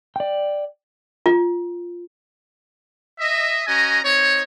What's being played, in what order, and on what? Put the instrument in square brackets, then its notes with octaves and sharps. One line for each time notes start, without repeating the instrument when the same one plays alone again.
[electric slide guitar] D5 G5
[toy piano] F4
[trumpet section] D#5 E5
C#4 F#4 D#5 G#5 A#5
C4 D#4 C#5